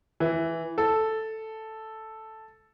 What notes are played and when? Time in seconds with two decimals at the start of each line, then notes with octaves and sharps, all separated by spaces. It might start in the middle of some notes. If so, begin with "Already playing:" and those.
0.20 E3
0.78 A4